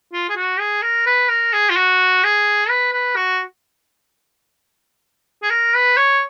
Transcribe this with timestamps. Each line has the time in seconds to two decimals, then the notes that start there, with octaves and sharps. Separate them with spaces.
0.13 F4
0.29 G#4
0.36 F#4
0.60 G#4
0.82 A#4
1.06 B4
1.29 A#4
1.53 G#4
1.70 F4
1.76 F#4
2.24 G#4
2.69 B4
2.93 B4
3.16 F#4
5.43 G#4
5.50 A#4
5.75 B4
5.97 C#5